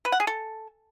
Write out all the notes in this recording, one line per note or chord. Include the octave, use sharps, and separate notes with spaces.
B4
F#5
G#4
A4